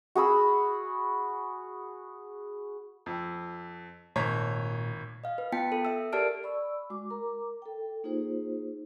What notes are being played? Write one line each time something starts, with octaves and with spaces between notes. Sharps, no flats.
F#4 G#4 B5 E6
F2
G#1 A#2 C#5 A#5
D#5 F5
B4
B3 F4 G5 A5 B6 C#7
A4
E5 E6
G4 A#4 D5 A5 F6 D7
D5 B5 C#6 E6
G#3 F#4 D6
A#4 A#5 D6
A4 G5
A#3 D#4 F4 G#4 C5